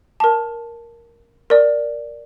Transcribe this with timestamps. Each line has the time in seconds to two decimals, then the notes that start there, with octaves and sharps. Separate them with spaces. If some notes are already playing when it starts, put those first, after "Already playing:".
0.20 A#4 A5
1.50 A#4 D5